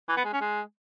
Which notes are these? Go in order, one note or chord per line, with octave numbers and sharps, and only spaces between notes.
E3
B3
G#3
C#4
G#3